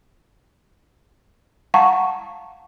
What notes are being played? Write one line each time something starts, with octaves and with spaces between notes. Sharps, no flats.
F5 F#5 A5 A#5 C#6